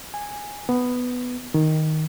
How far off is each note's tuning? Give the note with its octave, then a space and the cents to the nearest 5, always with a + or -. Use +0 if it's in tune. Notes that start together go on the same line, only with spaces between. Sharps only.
G#5 -10
B3 +5
D#3 +5